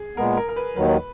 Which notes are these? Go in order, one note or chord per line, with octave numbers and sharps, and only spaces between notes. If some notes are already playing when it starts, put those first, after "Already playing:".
Already playing: G#4
A#2 G#3 B3 A#4
A#4
A#4
B4
D#2 D#3 F#3 B4